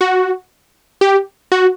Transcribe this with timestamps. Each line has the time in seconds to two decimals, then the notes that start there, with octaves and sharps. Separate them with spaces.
0.01 F#4
1.01 G4
1.52 F#4